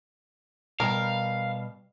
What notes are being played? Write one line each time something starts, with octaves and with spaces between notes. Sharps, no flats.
B2 G3 A#4 F5 G5